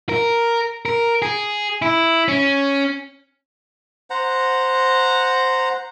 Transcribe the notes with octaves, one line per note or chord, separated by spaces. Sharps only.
A#4
A#4
G#4
E4
C#4
C5 F#5 A#5